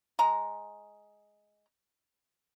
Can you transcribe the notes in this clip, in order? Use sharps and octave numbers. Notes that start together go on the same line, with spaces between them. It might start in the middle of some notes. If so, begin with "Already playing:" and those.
G#3 A#5